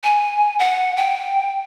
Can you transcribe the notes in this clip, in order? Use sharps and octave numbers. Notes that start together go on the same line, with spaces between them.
G#5
F#5
G5